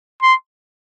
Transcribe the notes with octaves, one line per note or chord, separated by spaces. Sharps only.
C6